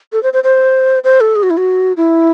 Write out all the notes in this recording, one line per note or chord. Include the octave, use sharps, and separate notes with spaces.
A4
C5
C5
C5
C5
A4
G#4
F#4
E4
F#4
E4